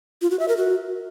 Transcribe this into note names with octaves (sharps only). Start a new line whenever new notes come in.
F4
F#4
E5
A#4
F#4